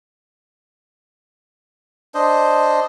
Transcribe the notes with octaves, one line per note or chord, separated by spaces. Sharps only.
D4 C5 D#5